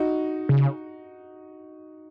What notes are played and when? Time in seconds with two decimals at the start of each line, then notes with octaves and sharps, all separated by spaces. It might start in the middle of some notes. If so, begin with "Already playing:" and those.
Already playing: D#4 F#4
0.49 C#3